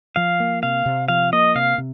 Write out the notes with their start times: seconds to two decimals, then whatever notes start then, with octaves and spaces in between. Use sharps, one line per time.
0.16 F3 F5
0.40 A#3
0.63 C3 F5
0.86 C3
1.08 F3 F5
1.33 A#3 D#5
1.55 C3 F5
1.78 C3